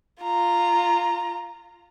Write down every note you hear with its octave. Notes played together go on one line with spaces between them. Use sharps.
F4 A#5